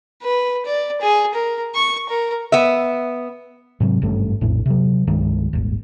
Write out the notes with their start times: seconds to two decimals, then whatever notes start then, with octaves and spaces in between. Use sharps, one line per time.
0.22 B4
0.66 D5
1.01 G#4
1.34 A#4
1.75 C#6
2.09 A#4
2.52 B3 E5
3.80 G#2 C3 F#3
4.02 G#1 G2 A3 C#4
4.41 A#1 F2 A2
4.66 C3 F#3
5.07 C2 G2 D#3 G#3
5.53 D#1 G#1